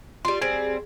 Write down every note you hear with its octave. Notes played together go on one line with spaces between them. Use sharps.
G3 F4 C6
G3 C4 G#4